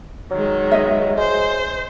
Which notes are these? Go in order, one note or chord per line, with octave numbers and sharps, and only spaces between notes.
D#3 F#3 G#3
B4 D#5 E5
G#3 C5